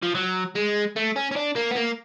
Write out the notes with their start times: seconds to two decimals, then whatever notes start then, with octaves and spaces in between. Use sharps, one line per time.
0.03 F3
0.15 F#3
0.55 G#3
0.96 A3
1.16 C#4
1.31 C#4
1.36 D4
1.56 A#3
1.71 B3
1.76 A#3